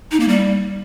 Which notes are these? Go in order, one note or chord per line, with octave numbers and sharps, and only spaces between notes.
D#4
A#3
G3